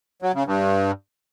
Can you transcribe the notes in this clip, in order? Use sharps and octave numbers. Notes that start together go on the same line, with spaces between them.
F#3
C#3
G2